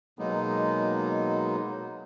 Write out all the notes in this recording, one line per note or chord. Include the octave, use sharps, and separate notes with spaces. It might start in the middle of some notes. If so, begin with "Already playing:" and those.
B2 F#3 G#3 A#3 B3 D#4